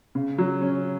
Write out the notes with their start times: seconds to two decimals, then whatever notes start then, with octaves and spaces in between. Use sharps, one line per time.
0.15 C#3
0.38 F#3
0.61 C#4